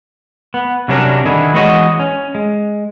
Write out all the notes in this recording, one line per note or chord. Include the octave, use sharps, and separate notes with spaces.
B3
C3 F#3 G3 C#4 D4 A#4
D3 D#3 E4 G#4
E3 G#3 B3 F#4 C#5 D#5
C#4
G#3